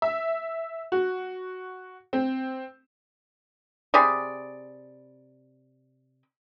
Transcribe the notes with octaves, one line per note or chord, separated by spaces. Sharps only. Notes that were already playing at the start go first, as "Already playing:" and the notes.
E5
F#4
C4
C3 G#4 D5 B5